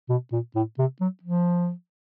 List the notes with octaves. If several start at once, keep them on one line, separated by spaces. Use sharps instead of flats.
B2
A#2
A2
C3
F#3
F3